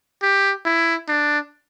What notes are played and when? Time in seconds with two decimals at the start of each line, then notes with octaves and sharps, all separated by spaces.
0.23 G4
0.65 E4
1.09 D4